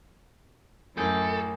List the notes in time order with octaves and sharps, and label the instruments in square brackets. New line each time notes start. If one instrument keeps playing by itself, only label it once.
[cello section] F#2 [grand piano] A2 A#3 [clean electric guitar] G#4 G5 [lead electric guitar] A4